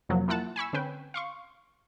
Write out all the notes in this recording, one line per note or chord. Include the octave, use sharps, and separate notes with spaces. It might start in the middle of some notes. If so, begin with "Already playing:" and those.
F2 C3 F3 F#3 A#3
A#3 E4 F4 F#5 A5
G#5 B5 C#6 E6
D3 C4 C#4 B4 G5
F5 C6 C#6